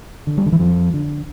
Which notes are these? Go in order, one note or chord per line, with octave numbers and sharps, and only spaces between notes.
D3
G3
D3
E3
F2 F3
D3